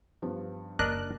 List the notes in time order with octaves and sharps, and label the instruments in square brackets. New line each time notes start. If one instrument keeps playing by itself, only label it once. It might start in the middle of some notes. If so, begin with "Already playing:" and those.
[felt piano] G2 F3 B3
[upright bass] F#1 [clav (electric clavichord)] D4 A#4 D#5 [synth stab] F#6